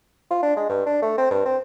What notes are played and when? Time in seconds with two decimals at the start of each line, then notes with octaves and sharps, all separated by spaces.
0.31 F4
0.42 D4
0.56 G#3
0.69 G2
0.86 D4
1.02 A3
1.18 C4
1.31 G2
1.45 C4